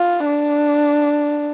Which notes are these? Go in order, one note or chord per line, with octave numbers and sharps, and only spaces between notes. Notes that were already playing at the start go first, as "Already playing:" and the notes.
Already playing: F4
D4